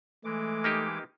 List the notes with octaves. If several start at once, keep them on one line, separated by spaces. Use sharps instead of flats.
E3 G#3 A3 D6
A#3 D#4 G4